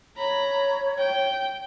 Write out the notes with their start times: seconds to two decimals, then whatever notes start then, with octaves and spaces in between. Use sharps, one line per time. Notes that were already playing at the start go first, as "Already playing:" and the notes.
0.17 C#5 A#5 B5
0.98 G5